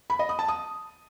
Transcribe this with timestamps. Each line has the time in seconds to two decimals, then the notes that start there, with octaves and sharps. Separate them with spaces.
0.10 B5
0.19 D#5
0.29 D#6
0.39 A5
0.48 D#6